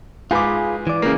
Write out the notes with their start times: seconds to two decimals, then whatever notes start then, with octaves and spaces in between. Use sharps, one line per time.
0.31 G#2 F4 G#4 B4 D6
0.87 E3 D5
1.02 C#3 A#3